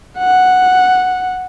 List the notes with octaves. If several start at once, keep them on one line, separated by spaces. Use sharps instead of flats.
F#5